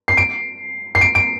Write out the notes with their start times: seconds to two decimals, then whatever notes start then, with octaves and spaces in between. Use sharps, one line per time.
0.08 C7
0.17 D7
0.95 C7
1.01 D7
1.15 D7